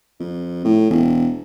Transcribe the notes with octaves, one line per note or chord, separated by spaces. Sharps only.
F2
A2
E1